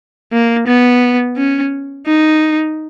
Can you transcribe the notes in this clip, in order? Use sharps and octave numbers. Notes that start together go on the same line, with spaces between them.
A#3
B3
C#4
D#4